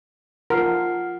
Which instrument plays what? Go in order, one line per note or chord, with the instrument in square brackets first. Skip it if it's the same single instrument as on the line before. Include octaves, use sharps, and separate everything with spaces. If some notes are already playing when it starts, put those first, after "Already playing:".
[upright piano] F3 [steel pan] A#4 [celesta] F#5 F6 C7